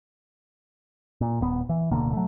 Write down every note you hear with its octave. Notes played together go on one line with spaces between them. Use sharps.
A#2
D#1 B3
E3
D1 B2 D3 A#3
F#3 A3